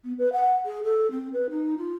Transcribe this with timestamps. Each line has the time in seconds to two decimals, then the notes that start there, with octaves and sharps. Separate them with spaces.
0.04 B3
0.18 B4
0.33 F#5
0.65 G#4
0.83 A4
1.11 C4
1.33 B4
1.50 D#4
1.77 F4